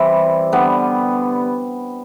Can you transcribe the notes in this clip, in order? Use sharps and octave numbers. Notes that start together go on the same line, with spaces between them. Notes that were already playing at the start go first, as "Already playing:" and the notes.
Already playing: E3 G3 C4
D3 G3 B3